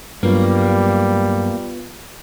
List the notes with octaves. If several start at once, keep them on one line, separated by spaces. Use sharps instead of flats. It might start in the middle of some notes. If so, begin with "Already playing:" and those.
G2 F#3 G3 A#3 B3 F4 B4